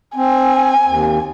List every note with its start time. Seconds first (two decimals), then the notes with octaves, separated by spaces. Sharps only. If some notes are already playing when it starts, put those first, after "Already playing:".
0.16 C4 G#5
0.87 D#2